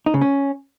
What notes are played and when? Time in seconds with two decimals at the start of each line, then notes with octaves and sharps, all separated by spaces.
0.06 D#4
0.14 C#3
0.21 C#4